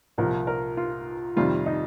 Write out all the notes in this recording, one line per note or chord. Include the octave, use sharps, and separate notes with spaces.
C2 A#2 F3 A#4
A#4
F4
F2 C3 D#3 G3 F4
D#4